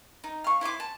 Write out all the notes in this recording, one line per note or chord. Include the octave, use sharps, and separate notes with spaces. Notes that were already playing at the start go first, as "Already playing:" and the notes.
D#4
F5 C#6
E4 C5 C6 D6
A5